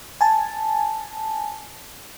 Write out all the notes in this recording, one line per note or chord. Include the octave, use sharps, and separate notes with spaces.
G#5 A5